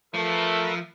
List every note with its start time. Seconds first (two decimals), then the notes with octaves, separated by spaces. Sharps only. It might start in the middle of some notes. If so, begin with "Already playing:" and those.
0.14 F3 A3 A#4 B4 E5